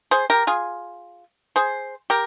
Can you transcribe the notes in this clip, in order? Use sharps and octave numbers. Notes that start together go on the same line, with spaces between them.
G#4 C5
G4 A#4
F4 G#4
G#4 C5
G4 A#4